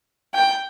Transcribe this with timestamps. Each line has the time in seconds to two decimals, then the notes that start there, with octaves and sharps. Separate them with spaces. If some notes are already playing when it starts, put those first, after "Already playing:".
0.34 G5